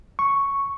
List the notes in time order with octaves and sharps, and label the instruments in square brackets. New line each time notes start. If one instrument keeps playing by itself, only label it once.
[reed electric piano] C#6